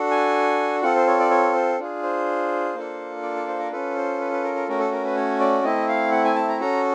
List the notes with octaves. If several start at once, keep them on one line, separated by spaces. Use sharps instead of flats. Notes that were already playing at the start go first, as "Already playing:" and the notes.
Already playing: D4 F#4 A4
G#5
C4 F4 A4 F#5
C5
C#5
D5
C#5
C5
D4 F4 G#4
C5
A#3 D4 F4 A4
D5
D5
C5
A#4
C#4 F4 A4 B4
C5
B4
B4
A#4
A#4
A3 C#4 F#4 A#4
A4
A#4
B4
C#5
D5
A3 C4 E4 D#5
F5
F#5
G#5
A5
A#5
C#4 F#4 A4 A#5